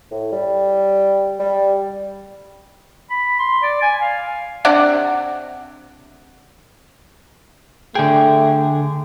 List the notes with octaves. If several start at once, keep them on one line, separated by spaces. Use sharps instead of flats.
A2
G3
G3
B5
C6
D5
G#5
F5
C3 D4 D5 F#5
D3 A3 G#4 G5